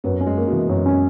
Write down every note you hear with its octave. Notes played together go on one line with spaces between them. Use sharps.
F#2 B3
C#4
G#3
A#3
B2
E3
F#2
C#4